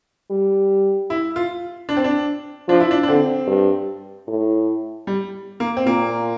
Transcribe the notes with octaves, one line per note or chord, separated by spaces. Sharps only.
G3
E4
F4
D4
C4
D4
F3 D4
E4
D4
D4
D3 C4
G2
A2
G3
A#3
C4
A#2 A#3